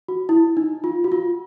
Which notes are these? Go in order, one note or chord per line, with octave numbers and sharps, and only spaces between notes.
F#4
E4
D#4
F4
F#4
F4